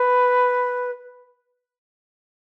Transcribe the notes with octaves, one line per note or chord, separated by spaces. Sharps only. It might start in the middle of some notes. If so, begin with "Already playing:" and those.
Already playing: B4